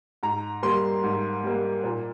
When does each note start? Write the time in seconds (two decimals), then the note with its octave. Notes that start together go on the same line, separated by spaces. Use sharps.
0.23 G#2 A#5
0.63 G3 A#3 C6
1.04 G#2
1.44 G3 A#3
1.84 A#2